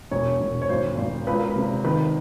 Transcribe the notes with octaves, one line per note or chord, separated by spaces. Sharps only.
E1 C#5
E1
C#5
G#1 C5
G#1
C#2 B4
A#4
C3 B4
D#3 B4